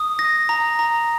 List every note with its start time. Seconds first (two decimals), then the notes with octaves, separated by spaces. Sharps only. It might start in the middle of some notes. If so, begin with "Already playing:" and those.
Already playing: D#6
0.19 A#6
0.49 A#5
0.79 A#5